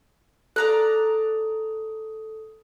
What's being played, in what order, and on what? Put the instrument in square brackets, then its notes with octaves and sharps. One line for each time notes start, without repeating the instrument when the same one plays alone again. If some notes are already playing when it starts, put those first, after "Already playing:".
[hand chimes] A4 [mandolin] D5 A#5 F#6